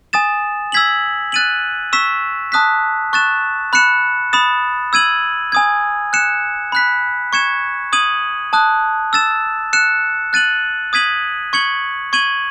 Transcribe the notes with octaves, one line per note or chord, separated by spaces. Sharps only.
G#5 D#6 A6 E7
E6 G#6 B6 F#7
F#6 A6 D#7 F#7
C#6 E6 B6 E7
A5 D#6 F#6 B6
C#6 F#6 A6 E7
B5 F#6 C#7 E7
B5 D#6 A6 E7
E6 G#6 D#7 F#7
G#5 D#6 G#6
F#6 C#7 E7
B5 F#6 B6
C#6 G#6 C#7 E7
D#6 G#6 D#7 F#7
A5 D#6 F#6
E6 A6 E7
F#6 C#7 E7
F#6 A6 D#7 F#7
D#6 G#6 B6 D#7 F#7
C#6 G#6 C#7 F#7
C#6 G#6 D#7 F#7